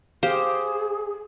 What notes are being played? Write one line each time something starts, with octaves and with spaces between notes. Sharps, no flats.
G4 G#4 C5 F5